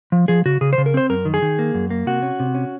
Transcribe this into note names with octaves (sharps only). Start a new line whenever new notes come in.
F3
F3 G#4
C#3 F#4
C#3 G#4
C5
C#3
A#4
C4 C5
F#2 A#4
D#3
G#4
D#3
A#3
F#2
A#3
C3 F#4
C#4
C3
C#4